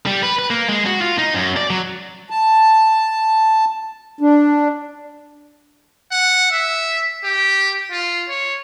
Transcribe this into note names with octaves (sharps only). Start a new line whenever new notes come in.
G3
B4
B4
A#3
G#3
F#4
F4
D#4
F#2
D5
F#3
A5
D4
F#5
E5
G4
F4
C#5